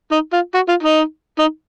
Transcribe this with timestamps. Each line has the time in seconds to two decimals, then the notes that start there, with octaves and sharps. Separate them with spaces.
0.12 D#4
0.33 F4
0.54 F#4
0.69 F4
0.83 D#4
1.39 D#4